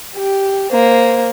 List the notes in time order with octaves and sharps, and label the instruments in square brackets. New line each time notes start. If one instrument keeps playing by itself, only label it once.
[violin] G4
A#3 C5